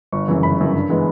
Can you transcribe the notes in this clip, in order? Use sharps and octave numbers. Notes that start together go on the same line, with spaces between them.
G1 C#6
F#2 C#3 E3
G1 B5
F#2 C#3 E3
G2
E3 G#3 B3